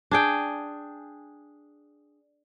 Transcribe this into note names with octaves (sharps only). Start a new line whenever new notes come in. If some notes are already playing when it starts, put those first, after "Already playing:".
D4 G#4 G5